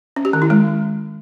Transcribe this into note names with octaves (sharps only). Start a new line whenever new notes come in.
C#4
G4
D#3
E4
G#3